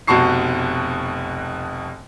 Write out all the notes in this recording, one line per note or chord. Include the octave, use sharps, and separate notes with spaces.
F1 B2 F#4 A5 C#6 C7